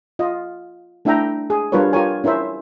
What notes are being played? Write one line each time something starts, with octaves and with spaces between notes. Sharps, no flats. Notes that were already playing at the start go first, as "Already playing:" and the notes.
F4 D#5
A3 D4 E4 E5 G5 A#5
G#4
G3 D4 F4 A#4 B4 C#5
F4 G4 A#4 C#5 G#5
C#4 E4 A#4 C5 E5